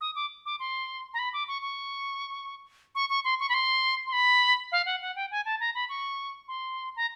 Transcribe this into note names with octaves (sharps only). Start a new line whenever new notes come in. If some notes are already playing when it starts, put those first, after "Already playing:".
D#6
D6
D6
C6
A#5
B5
D6
C#6
C#6
C#6
C#6
C6
C#6
B5
C6
C6
B5
F5
F#5
F#5
G5
G#5
A5
A#5
B5
C#6
C6
A#5